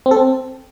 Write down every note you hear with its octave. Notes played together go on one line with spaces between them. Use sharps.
C4
A4
C4